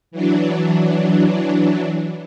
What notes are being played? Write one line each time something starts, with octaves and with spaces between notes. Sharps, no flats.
E3 F#3 D4